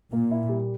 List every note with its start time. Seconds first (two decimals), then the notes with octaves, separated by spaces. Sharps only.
0.13 A#2 A#3
0.31 E4
0.49 G3